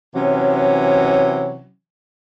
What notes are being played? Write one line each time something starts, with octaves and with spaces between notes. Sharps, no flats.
C3 E3 F#3 C#4